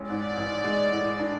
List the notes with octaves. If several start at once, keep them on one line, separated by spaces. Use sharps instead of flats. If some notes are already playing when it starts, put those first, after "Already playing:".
Already playing: A1 G#3 C#4
G#2 D5
A1
G#3
A2
D4